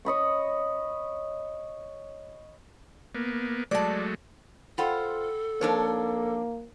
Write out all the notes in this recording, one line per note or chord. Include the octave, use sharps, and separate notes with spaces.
C#5 D#5 B5 C#6
A#3 B3
F#3 G#3 A3 D5 A5
F4 A4 C5 F#5 G5 B5
F2 A#3 D4 D#4 A#4 C5 C#5